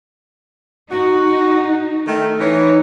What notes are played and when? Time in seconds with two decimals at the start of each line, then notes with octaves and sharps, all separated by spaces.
0.91 D#4 F#4
2.07 D#3 A3
2.40 E3 D#4 C#5